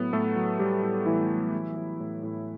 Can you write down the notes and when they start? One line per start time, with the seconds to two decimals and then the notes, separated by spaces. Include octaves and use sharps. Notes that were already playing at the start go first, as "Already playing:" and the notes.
Already playing: A2 F#3 B3
0.13 A2 A3 A4
0.36 F#3
0.59 F#3 G3 G4
0.82 A2
1.06 A2 E3 E4
1.30 F#3
1.54 E3
1.76 E3
2.00 A2
2.23 A2